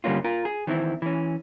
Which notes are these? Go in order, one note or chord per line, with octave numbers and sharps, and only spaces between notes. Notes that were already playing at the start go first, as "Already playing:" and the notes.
G2 D3 G3 A#3 C#4 F4
F4 A#4
G#4
D#3 E3 C4 E4
E3 C#4